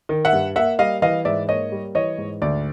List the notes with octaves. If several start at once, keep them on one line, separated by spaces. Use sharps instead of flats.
D#3
E5 F#5
G2
A#3 E5 F#5
G3 D#5 F5
E3 D#5 F5
G#2 D5 E5
A#3 C#5 D#5
G3
E3 C#5 D#5
G#2
D2 D5